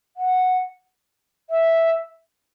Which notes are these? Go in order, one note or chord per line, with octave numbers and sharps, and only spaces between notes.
F#5
E5